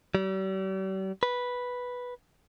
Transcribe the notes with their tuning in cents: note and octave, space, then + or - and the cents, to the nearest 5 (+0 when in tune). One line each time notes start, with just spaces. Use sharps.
G3 -45
B4 -5